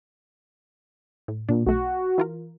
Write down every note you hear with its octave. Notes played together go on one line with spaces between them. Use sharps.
A2
A#2 D4
B1 A3 F#4
E3 F4 A#4